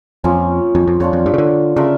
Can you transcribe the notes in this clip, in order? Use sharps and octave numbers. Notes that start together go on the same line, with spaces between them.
F2 F3 A#3 C#4
F2
F2
F2 D4 F4 C#5
F2
G2
C#3
D3
C#3 D4 F4 A#4 E5